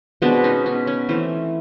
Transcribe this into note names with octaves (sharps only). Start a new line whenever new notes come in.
B2 G#3 B3 C4 D4
C#4 D#4
C#4
C#4
E3 A3 C4